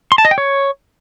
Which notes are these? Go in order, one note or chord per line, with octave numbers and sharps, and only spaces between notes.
C6
A5
D#5
G5
C#5